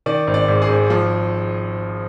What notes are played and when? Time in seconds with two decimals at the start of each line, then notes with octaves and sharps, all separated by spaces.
0.06 D#3 D5
0.27 G#1
0.34 D5
0.48 G#2
0.62 G#4
0.69 G#1
0.90 F3